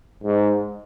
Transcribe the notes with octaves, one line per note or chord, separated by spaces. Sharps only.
G#2